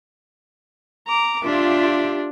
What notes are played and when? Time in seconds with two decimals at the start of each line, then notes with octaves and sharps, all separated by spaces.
1.07 A#5 D6
1.44 D4 F4 G4 E5